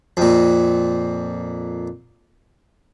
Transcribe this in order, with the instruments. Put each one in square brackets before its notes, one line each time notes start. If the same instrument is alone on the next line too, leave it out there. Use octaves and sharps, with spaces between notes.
[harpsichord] F2 A#2